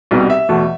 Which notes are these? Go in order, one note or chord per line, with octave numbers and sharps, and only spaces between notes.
C2 B2 G3 B3 D#4
E5
E2 B2 A3